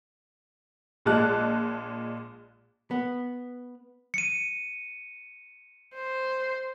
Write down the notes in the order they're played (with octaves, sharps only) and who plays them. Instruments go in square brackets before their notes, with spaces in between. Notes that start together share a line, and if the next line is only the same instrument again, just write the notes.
[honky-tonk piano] A#1 A#2 G#3 A5 F#6
[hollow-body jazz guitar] B3
[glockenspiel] C#7 D#7
[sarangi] C5